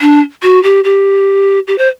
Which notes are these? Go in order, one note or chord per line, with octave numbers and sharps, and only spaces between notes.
D4
F#4
G4
G4
G4
C5